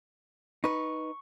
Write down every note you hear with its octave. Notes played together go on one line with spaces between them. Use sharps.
D#4 B4 C#6